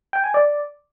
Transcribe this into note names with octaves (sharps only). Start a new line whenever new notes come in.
G5
G#5
D5